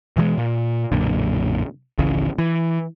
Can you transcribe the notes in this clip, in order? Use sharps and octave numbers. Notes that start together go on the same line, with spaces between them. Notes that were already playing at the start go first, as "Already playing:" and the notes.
B2 E3 F3 G#3
A#2
B1 F#2 A#2 D3
G#1 C#2 C#3 E3
E3